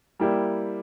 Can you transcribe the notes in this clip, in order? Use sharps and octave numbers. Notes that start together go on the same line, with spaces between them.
G3 A#3 E4 G4